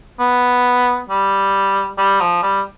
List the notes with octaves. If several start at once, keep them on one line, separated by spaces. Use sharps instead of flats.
B3
G3
G3
F3
G3